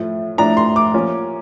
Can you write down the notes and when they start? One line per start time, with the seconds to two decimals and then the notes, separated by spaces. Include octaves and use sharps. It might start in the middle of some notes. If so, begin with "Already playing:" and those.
Already playing: A2 F3 A3
0.38 A2 F3 A3 D4 A#5
0.57 C6
0.76 D6
0.94 F3 A#3 C#4